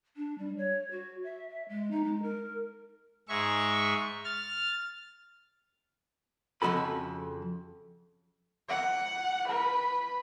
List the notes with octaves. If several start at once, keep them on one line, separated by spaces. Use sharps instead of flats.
D4
G3
C#5
F#4
E5
E5
G#3
D#4
G#3
A#4
G#2 G#3 E5 C#6
F6 A6
F2 C#3 G#3 F#4 A4 B5
F#5
B4